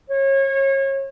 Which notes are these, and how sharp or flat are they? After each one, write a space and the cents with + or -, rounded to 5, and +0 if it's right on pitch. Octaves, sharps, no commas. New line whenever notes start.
C#5 -30